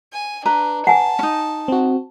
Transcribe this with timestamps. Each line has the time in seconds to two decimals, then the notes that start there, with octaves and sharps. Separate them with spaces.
0.13 G#5
0.46 D4 B4 A#5
0.87 F#5 G#5 A5
1.19 C#4 D#4
1.68 C4 F#4